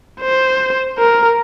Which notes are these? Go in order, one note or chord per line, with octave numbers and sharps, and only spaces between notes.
C5
A#4